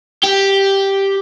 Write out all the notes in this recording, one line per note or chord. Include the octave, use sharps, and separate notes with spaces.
G4